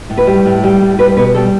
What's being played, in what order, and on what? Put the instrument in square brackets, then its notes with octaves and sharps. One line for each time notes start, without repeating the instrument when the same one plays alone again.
[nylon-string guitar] A2
B4
G3
A2
G3
A2
G3 B4
B2 B4
G3 A4